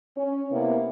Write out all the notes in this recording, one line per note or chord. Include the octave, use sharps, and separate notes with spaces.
C#4
C3 A#3 B3 E4